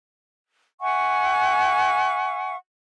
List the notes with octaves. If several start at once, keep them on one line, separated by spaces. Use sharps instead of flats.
E5 F#5 G#5 C#6